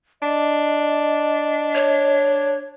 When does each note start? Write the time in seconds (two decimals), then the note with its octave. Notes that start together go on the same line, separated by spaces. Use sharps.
0.22 D4 D#5
1.75 C#5